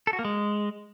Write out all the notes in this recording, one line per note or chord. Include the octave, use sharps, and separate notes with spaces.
A4
F#4
A#3
G#3